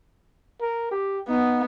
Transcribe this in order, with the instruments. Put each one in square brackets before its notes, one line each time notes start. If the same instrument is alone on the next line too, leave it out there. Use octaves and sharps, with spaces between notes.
[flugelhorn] A#4
G4
[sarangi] B3 [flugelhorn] D#4